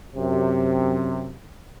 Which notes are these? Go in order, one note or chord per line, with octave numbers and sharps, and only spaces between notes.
F#2 C3